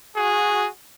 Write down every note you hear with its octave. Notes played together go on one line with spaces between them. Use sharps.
F#4 G#4